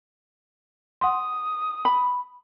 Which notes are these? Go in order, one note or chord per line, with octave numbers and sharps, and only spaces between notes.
F#5 C6 D#6
B5